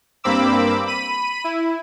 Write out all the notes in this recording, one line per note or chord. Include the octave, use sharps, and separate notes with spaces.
G2 A#3 C4 B5 D6 E6
B5 D#7
E4